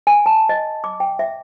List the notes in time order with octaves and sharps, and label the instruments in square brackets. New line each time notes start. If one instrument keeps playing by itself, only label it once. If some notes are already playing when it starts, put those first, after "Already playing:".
[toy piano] G#5
A5
D#5
D6
G5
E5